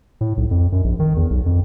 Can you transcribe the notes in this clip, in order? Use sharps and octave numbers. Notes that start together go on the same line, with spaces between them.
A2
B1
F2
F#2
A#1
D#3
E2
B1
F2